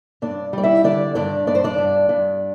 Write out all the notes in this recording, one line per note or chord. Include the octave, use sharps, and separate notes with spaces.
G2 D4 D5
G3 D5
E4 E5
D3 D4 D5
G2 D4 D5
G2 D5
C5
D4 D5
G2
G2